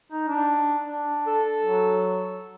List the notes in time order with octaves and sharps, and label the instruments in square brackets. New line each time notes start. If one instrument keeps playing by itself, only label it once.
[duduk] D#4
D4
D4
[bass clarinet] A4
[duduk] F#3